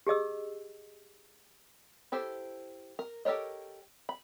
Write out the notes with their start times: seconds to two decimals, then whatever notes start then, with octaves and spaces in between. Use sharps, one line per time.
0.07 G4 G#4 D#5 E6
2.12 E4 G4 A4 C5
2.99 A#4
3.25 G4 A4 A#4 C#5 D#5
4.09 B5